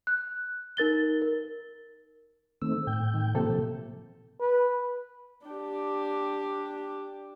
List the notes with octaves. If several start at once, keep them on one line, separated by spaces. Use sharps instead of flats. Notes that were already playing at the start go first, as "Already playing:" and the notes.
F#6
D#4 A#4 A6 G7
A#4
D#3 A3 C4 E6
A2 G5
D#3
C3 F3 A#3 C4 A4
A#2 F3
B4
D4 G4